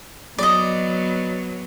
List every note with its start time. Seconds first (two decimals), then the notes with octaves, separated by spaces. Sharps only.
0.38 F#3 B3 D5 D#5